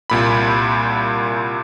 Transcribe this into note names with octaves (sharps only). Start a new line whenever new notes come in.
C2 A#2 B5